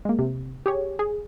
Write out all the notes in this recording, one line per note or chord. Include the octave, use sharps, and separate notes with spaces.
G#3 A#3
C3
G4 G#4 C#5
G#4